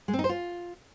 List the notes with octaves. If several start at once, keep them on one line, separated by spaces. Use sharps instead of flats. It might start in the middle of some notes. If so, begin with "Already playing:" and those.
G#3
C4
D#4
C5
F4